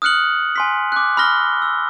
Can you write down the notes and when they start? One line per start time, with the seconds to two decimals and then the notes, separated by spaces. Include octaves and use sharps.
0.02 D#6 F6 F#6 C#7 F#7
0.56 G#5 C6 B6
0.92 D6 F#6
1.17 B5 E6 F6 A#6 G7
1.62 E6